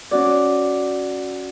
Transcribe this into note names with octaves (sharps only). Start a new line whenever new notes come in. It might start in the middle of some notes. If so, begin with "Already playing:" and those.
C#4 F#4 D5